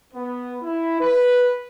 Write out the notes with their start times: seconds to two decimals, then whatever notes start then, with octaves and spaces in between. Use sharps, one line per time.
0.13 B3
0.62 E4
1.01 B4